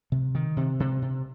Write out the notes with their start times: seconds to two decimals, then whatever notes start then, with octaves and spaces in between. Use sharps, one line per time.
0.12 C3
0.35 D#3
0.57 C3
0.80 C3
1.02 C3